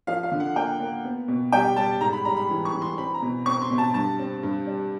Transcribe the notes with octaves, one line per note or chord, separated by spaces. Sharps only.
F3 F5
F5
D3
F#5
A#3 G5
A#3
B3
B2
G3 G5
G3 A5
G#2 A#5
B5
G3 A#5
B5
E3
C#6
E3
C6
C4 B5
A#5
B2
C4 C#6
C6
B2
A5
G2 A5
C4
G2
G3